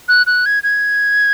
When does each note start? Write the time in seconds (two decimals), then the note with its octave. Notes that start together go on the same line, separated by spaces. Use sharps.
0.08 F#6
0.27 F#6
0.46 G#6
0.63 G#6